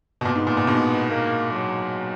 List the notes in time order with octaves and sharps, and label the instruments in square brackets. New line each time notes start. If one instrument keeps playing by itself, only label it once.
[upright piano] B2
[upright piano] A#2 [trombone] B3
[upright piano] G#2
A#2
A#2
G#2 B2
[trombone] A#3
F#3